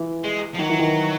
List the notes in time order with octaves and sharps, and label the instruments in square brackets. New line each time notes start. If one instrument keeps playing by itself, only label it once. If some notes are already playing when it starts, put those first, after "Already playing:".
Already playing: [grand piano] E3
[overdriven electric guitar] G#3
F3
[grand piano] D#3 [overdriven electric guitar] F#3
[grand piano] E3
D#3